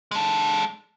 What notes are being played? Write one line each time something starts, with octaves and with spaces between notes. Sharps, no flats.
G#3 A4